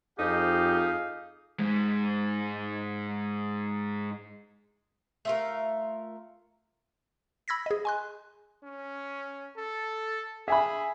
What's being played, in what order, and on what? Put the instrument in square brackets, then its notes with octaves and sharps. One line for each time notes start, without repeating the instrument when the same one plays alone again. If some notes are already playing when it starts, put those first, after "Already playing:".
[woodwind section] F2 [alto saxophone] D#4 [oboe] G4 [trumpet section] G#4 F5
[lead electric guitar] G#2 G#3
[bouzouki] A3 F4 A#4
[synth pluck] B5 E6 G#6 A#6 B6
G#4 D#5
G#5 C6 F#6
[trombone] C#4
A4
[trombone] G#4 [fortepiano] E5 G#5 B5